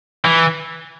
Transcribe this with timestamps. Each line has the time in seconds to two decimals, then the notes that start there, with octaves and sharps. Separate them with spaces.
0.25 E3